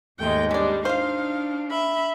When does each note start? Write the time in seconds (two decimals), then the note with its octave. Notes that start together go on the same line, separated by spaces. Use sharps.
0.19 D#2 G#2 G#3 A3 G5
0.51 G3 C#4 D4 D5
0.85 D4 D#4 F4 C5 F5
1.71 E5 B5